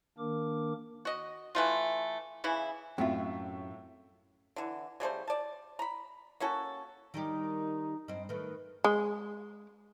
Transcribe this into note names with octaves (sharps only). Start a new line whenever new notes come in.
D#3 A#3 D4 A#4 D6
F#4 D#5
E3 A3 F4
C#3 E3 E4
F#2 A2 C4 F4 E5
D3 E3
C#3 G3 A3 C5
D5 A5
A#5 B5
A#3 C#4 F#4 A4
D#3 G3 D#4 G4
G2 C4 D#5
D#3 A3 B4
G#3